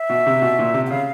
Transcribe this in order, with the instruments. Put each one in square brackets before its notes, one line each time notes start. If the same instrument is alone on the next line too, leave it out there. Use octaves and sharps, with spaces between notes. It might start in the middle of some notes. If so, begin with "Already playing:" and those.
Already playing: [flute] E5
[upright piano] B2
C3
B2
A#2
C3
[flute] F#5
[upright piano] C#3 [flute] F5